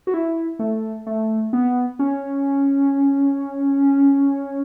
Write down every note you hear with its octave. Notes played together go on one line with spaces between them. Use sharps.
F#4
E4
A3
A3
B3
C#4